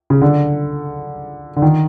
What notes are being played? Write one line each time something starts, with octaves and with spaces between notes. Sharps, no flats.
C#3
D3
D3
D#3